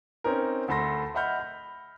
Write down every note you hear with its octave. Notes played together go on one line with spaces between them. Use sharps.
C4 C#4 D#4 A#4
D2 A3 A4 B5 C6 A#6
D#5 E5 F#5 B5 F6 G6
B5